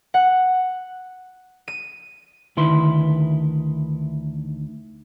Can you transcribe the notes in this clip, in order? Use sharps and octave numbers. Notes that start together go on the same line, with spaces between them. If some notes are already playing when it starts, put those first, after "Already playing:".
F#5
D#7
D2 D#3 E4 B4 C6